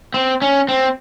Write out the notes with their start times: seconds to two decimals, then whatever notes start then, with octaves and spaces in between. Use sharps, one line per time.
0.14 C4
0.42 C#4
0.69 C4